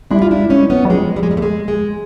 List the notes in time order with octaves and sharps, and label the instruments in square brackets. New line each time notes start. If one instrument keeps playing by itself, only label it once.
[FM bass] G3 [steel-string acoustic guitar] D4 E4
[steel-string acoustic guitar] F4
D4 E4
[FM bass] G#3
[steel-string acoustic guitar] C#4 D#4
[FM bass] F#3
[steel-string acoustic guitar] B3 C#4
[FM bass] F#3
[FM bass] F3 [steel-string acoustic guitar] G#3
[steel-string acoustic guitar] G3
G#3
G3
A3
G#3
G#3